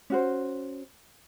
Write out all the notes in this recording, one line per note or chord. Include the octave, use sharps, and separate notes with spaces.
C#4 F#4 C5